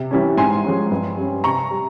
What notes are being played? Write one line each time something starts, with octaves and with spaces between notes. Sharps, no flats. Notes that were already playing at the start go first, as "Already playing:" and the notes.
Already playing: C3
E3 G3 C#4
G#2 G#5 C6
F3 G#3 C#4
G2
G3 C#4
C3 A#5 C#6
G3